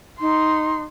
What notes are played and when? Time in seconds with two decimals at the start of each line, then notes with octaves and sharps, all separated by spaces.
0.20 D#4 C6